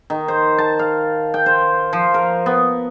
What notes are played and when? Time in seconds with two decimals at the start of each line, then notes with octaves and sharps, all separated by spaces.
0.10 D#3
0.28 C5
0.58 A5
0.79 F5
1.34 G5
1.46 C5
1.93 F3
2.14 A#4
2.46 B3